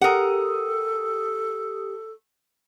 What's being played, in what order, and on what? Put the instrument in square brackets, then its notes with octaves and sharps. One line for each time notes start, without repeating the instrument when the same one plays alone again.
[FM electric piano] G4 D#6 [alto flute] A4 [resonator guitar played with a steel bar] A#4 F#5